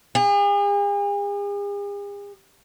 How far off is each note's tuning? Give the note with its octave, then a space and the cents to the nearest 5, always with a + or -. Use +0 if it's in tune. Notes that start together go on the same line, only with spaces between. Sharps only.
G#4 -45